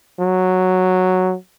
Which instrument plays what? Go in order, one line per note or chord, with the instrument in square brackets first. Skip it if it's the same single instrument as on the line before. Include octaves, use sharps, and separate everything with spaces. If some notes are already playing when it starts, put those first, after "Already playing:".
[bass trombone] F#3